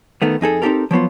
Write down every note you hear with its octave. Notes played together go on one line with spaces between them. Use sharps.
D#3 A3 B3
F2 D#4 G#4 A4
C4 D#4 F#4 G4 A4 A#4
F3 F#3 B3 F4